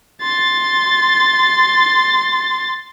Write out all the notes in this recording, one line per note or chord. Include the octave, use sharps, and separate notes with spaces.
C6 A6